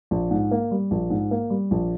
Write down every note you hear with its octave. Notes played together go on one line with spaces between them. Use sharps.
A#1
G#2
A#3
G3
A#1
G#2
A#3
G3
A#1